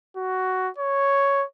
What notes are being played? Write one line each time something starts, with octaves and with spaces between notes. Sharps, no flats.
F#4
C#5